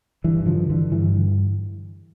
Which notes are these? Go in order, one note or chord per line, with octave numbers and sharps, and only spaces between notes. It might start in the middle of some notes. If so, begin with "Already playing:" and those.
G2 E3
D3 F3
D3 E3
G2 E3